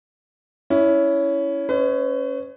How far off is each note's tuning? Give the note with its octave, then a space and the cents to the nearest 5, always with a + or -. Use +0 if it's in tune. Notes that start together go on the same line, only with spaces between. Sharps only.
C#4 +15 E4 +0
C#4 +0 B4 +40 D#5 +0